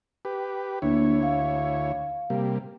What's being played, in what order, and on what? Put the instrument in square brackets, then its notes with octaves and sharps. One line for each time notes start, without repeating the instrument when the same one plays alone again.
[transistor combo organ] G4 B4
[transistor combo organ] D2 E4 C#5 [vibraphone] A#3 D4
[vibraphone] F5
[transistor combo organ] C3 G3 A#3